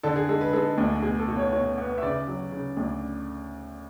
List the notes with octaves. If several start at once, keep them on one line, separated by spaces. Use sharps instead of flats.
D3 A4
G#4
G#3 A4
B4
G#3 A4
D2
B2 G#4
A4
B2
C#5
B2 C#5
B3
E5
C#3 D5
F#3
C#3
D2